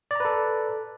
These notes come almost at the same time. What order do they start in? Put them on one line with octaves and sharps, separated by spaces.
D5 A#5 B4 A4